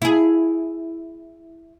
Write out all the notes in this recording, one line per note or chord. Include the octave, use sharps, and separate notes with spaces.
E4 G#4